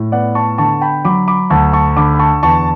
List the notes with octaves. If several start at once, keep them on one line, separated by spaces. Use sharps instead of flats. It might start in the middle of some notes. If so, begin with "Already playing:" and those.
Already playing: A2
B3 D5 F#5
A5 C#6
D3 A5 C#6
G5 B5
F#3 B5 D6
B5 D6
D2 A5 C#6
A5 C#6
D3 B5 D6
B5
A5 C#6
E2 A5 C#6